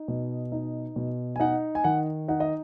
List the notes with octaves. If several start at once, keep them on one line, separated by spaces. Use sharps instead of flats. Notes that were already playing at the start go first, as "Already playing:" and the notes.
Already playing: D#4
B2
D#4
B2
G#5
D#4 F#5
G#5
D#3 F#5
D#4 F#5
D#5